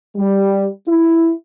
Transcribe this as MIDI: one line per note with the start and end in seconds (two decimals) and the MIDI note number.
0.17 0.69 55
0.88 1.32 64